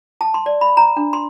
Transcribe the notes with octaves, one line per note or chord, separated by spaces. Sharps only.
A5
C6
D5
B5
A#5
D4
C6